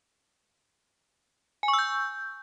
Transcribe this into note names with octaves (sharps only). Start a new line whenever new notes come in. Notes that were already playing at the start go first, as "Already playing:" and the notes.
G#5
C#6
E6
G6